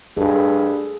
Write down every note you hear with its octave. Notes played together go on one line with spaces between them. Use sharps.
G2 G#4 A4